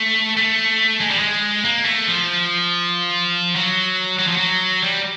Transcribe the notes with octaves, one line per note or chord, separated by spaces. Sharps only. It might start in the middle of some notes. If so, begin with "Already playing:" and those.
Already playing: A3
A3
G#3
G3
G#3
A#3
A3
F3
F#3
F#3
F3
F#3
G3